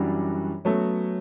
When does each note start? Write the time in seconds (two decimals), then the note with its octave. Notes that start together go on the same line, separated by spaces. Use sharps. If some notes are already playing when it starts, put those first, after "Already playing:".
Already playing: F#2 E3 G3 D4 F#4
0.65 F#3 A3 B3 C#4 F#4